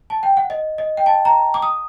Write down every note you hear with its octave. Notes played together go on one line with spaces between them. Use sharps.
A5
G5
F#5
D#5
D#5
G5
A5
A#5
D6
D#6